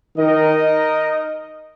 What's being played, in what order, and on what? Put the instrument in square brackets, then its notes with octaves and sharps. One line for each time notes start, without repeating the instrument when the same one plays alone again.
[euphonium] D#3 [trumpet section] D#4 A#4 D#5